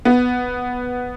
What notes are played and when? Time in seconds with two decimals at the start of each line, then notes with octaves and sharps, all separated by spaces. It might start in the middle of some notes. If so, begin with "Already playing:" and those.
0.05 B3